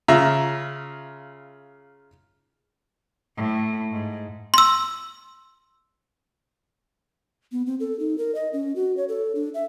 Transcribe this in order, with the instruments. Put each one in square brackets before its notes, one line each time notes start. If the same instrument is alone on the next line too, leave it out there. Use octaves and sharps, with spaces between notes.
[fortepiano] C#3 F4 E5 A#5
[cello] A2
G#2
[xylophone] C6 E6
[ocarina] B3
C4
A4
D#4
A#4
D#5
C#4
F#4
C#5
A4
D4
E5